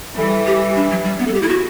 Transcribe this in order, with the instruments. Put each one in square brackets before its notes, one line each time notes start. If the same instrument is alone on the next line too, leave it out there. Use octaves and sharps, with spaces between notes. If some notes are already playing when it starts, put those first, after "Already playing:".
[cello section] E3 G3 [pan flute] A4
[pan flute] G4
D4
F#3
G3
B3
A4
G4
E4
F#4